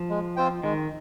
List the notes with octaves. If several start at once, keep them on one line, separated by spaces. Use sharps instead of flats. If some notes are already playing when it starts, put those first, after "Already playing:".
Already playing: F3
G#3
C4 F4 C5 G5
D#3 G#3